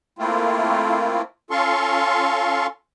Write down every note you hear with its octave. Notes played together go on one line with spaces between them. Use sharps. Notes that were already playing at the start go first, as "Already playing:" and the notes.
A3 A#3 C4 E4 F4
C#4 F4 A4 F5 C6 C#6